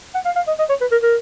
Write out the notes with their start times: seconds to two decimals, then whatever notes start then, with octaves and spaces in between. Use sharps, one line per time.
0.15 F#5
0.25 F5
0.36 F5
0.47 D#5
0.59 D#5
0.69 C#5
0.81 B4
0.92 A#4
1.03 A#4